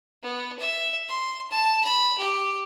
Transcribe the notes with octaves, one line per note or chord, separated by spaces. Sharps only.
B3
E5
C6
A5
B5
G4